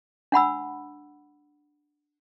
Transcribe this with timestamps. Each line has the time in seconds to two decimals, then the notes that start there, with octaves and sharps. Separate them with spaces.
0.32 D4 F#5 B5 E6